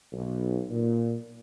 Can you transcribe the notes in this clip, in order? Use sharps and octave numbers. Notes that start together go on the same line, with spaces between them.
B1
A#2